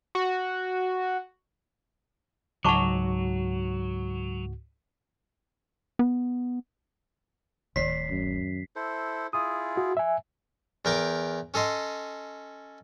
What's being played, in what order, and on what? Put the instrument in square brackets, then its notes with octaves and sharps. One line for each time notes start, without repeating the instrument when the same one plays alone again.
[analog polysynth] F#4
[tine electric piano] C#2 G#2 F#4 [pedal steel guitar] F#3 [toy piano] A5 C#6 D6
[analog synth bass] B3
[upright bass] D1 [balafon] D#3 D5 [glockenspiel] B6 C7
[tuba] F#2
[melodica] E4 A4 C5
[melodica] E4 F4 G#4 [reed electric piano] D#6
[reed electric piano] F#4
E5 G#5
[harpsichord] E2 A#4 G5 D6
C#4 A4 D#5 C6